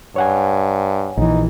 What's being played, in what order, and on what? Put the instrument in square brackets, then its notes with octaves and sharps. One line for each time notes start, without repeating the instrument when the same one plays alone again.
[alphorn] G2 [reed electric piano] C#5 F#5 G#5
[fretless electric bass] A#1 E3 [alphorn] D#4